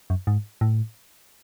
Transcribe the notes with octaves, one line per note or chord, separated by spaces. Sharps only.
F#2
G#2
A2